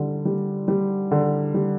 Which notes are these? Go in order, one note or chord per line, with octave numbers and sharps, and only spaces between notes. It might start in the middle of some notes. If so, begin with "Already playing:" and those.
Already playing: D3 G3
G3
G3
D3
G3